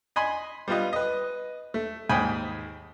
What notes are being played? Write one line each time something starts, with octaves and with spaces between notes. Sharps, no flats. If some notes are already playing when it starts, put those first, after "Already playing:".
D#5 G#5 B5 C6
G3 B3 F4 B4 D#5
B4 D#5
A3
D#2 G#2 G5 G#5 B5 D#6